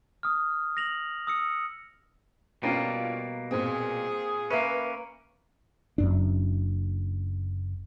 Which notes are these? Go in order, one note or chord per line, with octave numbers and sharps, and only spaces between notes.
D#6 F6
A#6 F7 F#7
D#6 E6 C#7
B2 G3 A#3 C#4 D4 F4
A#2 C4 G#4
A#3 C#4 B4 E5
F#1 F#2 D4